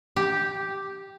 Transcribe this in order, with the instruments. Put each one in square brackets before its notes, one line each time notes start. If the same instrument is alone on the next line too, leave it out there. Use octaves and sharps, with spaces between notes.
[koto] G4